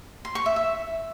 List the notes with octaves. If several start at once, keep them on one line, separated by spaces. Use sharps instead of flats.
C6
C#6
E5
E5